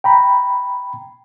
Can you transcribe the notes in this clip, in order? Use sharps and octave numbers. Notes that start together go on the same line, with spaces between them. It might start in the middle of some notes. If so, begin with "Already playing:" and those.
G5 A#5 B5